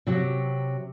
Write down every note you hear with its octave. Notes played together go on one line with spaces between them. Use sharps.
C3 F#3 G4